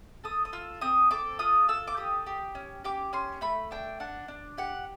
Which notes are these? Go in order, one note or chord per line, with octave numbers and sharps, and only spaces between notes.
A4 D#6
D#6
F4 E6
C4 D#6
A4 D6
F4 D#6
A4 E6
D6
G4 D#6
G4
C#4
G4 D6
C#4 C6
A3 B5
D4 G5
D4 F#5
D4
G4 F#5